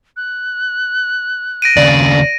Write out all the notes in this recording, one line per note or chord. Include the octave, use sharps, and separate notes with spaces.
F#6
A#6 D7 D#7
D#2 C#3 D5